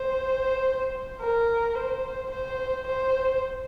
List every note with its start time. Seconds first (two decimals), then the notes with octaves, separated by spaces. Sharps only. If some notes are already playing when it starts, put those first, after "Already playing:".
Already playing: C5
1.20 A#4
1.75 C5
2.31 C5
2.87 C5